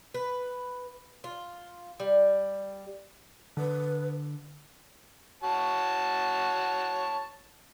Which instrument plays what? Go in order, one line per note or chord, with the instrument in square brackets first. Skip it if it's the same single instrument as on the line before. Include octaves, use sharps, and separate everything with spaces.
[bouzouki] B4
F4
G3
[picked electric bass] D3 [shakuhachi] B4
[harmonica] F#4 C#5 A5